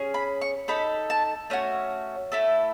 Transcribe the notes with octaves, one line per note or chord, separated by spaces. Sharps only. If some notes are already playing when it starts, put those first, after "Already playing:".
Already playing: C#4 G#4
B5
C#6
D#4 A4 B5
A5
A3 C#4 F#4 G#5
A3 E4 A4